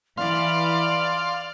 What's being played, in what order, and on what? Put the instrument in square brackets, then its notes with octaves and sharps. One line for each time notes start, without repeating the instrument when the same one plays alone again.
[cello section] E3 [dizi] D5 [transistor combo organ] F5 C6